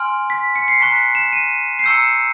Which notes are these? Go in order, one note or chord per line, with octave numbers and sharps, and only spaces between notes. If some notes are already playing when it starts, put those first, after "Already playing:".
Already playing: G#5 C6 F6
B6
C#7
C7
A#5 C#6 F#6 B6
E7
D#7
C7
A#5 C#6 E6 G6 C#7